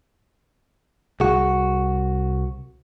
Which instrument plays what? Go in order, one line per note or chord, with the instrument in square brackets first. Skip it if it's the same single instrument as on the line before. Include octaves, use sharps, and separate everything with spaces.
[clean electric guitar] C2 F#4 [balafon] G#4